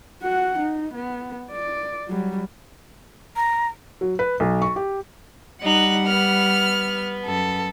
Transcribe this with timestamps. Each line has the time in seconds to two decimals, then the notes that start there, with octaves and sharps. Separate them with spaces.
0.23 F#4 F#5
0.59 D#4
0.94 B3
1.51 D5
2.09 F#3 G3
3.36 A#5
4.01 F#3
4.19 B4
4.40 B1
4.62 C#6
4.76 G4
5.63 G3 D#4 F#5 F#6
6.07 B3 F6
7.26 F#2 A4